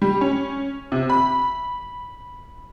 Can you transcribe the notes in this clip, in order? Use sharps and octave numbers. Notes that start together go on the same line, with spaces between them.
G3
C#4
C3
B5